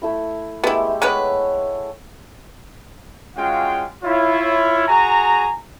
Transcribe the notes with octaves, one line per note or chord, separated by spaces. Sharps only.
A3 E4 B5
G#3 A3 B3 E4 G4
G#3 B3 B4 C#5 F#5
G#3 C#4 F4 F#4 F5 G5
E4 F4 C#5
F#4 G#4 G#5 A#5